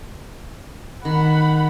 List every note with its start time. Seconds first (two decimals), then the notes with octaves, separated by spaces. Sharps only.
1.05 D#3 F#5 B5